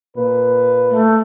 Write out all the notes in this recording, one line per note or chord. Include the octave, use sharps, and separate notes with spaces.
A#2 B4
A3